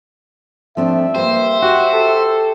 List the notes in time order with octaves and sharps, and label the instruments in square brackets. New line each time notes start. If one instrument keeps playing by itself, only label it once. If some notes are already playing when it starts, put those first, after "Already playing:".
[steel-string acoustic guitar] F3 C4 D4 [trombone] A3 [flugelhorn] E5
[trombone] G2 [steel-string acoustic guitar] A#3 G4 [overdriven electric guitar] C5
[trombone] F#4 [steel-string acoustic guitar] G4
[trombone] A4